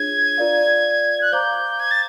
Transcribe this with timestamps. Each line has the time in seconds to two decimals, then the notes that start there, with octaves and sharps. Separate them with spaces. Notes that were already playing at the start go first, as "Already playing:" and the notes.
Already playing: D4 F4 G#4 C#5 G#6
0.37 F4 A#4 D5 F5
1.22 F#6
1.32 C5 F5 A#5 D6 G6
1.80 G#6
1.91 A6